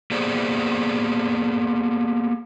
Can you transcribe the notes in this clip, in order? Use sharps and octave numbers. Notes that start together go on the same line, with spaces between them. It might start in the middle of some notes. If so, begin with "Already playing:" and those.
A#3 B3 G4 G#4 C5 D5